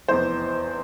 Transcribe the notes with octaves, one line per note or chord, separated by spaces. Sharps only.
F1 E2 E3 C5